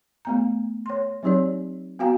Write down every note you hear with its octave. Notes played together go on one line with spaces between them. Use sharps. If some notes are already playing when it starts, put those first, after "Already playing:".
A3 B3 A#5
C#5 C6
F#3 C4 D#4 G4 C#5 D5
B3 F#4 F5 G5 G#5 A#5